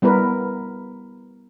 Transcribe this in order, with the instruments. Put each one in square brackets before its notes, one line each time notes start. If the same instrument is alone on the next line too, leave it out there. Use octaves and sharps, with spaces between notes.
[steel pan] G3 B3 E4 A#4 B4